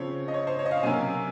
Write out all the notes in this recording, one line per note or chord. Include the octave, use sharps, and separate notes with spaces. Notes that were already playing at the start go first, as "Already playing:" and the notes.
Already playing: C#3 F3 C4 C#5
D#5
C#5
C5
C#5
D#5
F5
C3 F#3 A#3 C#4 G#5